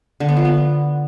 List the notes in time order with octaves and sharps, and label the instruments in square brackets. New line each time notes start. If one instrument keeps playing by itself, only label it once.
[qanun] D3
B3
F3
B3